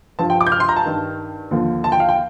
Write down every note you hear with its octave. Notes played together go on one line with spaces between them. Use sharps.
G2 F3 A5
G5
D6
G6
F6
C6
A#5
A5
G2 D#3
D#2 D3 F3
A5
G5
F5
G5